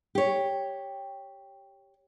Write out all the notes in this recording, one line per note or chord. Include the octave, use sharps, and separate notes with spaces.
G4 C#5